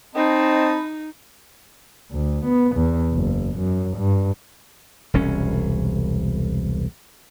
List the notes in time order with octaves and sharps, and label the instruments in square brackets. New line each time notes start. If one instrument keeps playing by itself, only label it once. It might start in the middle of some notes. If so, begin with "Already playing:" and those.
[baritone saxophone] C4 [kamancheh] D#4 [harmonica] D#5 A5 B5
[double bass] D2
B3
E2
F#1
F#2
G2
[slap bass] E1 C2 C#4